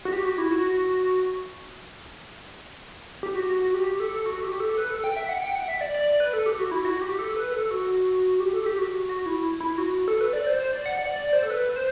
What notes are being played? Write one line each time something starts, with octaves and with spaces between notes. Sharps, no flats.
F#4
G4
F#4
E4
F#4
G4
F#4
F#4
F#4
G4
A4
F#4
G4
A4
B4
A4
G5
E5
F#5
G5
F#5
E5
D5
D5
D5
B4
A4
G4
F#4
E4
F#4
G4
A4
B4
A4
F#4
G4
A4
G4
F#4
F#4
E4
E4
F#4
A4
B4
D5
C5
C5
D5
F#5
D5
D5
C5
A4
B4
C5